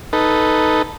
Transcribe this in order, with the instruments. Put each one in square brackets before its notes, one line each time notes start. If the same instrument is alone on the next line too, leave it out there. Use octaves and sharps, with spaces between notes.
[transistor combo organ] D#4 A4 B4